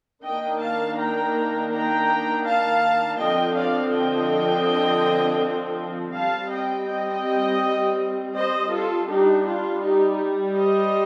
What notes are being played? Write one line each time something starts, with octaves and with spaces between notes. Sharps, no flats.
D#3 A#3 D4 D#5 G5
F5 A5
G5 A#5
G5 A#5
F5 A5
D3 F3 C4 D#5 G5
D5 F5
D#5 G5
G3 C4 F5 A5
D#5 G5
D#5 G5
C5 D#5
F4 A4
G3 D4 D#4 G4
D4 F4
D#4 G4
C5 D#5